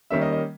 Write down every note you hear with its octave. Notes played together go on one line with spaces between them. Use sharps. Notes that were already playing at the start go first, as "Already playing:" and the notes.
D#3 G3 A#3 C#4 E5
D#5
D#5